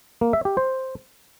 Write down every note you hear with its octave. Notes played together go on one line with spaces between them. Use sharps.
A#3
E5
G4
C5